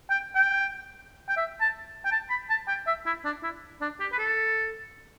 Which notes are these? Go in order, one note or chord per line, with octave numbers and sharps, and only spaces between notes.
G5
G5
G5
E5
A5
G5
A5
B5
A5
G5
E5
E4
D4
E4
D4
G4
B4
A4